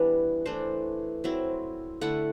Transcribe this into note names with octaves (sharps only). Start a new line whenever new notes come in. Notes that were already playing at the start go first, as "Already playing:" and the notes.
Already playing: E3 G3 B3 D4 B4
E3 A3 D4 C5
F#3 C4 E4
D3 A3 E4 F#5